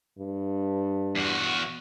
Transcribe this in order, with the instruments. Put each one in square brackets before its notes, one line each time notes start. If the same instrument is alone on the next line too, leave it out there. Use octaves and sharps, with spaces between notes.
[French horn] G2
[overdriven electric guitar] E2 F#4